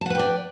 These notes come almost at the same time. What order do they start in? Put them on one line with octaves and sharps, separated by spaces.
A5 F#5 B4 G5 D5